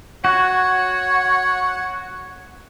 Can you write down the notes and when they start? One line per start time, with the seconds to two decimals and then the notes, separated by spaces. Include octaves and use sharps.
0.25 F#4 C#5 F#5